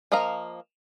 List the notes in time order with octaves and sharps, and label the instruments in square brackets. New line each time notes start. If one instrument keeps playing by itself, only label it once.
[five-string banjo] F3 A#3 D#5 F5 A#5